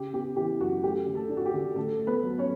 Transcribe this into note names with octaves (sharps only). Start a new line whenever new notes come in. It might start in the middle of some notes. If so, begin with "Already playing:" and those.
Already playing: C#3 G4
B3 G4
E3 G4
F#2 F#4
A3 G4
D3
A3 A4
D4
F#4
G4
D3
D3 A3 A4
A3
B3 B4
F#3
C#4 C#5